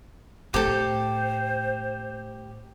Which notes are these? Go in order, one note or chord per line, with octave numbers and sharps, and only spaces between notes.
A2 G4 A4 C5